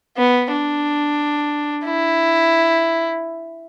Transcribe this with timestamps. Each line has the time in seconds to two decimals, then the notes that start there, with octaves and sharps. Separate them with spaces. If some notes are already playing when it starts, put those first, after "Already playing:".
0.17 B3
0.51 D4
1.86 E4